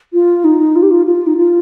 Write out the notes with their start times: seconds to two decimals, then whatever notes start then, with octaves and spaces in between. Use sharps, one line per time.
0.13 F4
0.44 D#4
0.76 F4
0.83 G4
0.91 F4
1.06 F4
1.27 D#4
1.37 F4